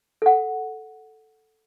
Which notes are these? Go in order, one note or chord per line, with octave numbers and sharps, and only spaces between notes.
A4 F#5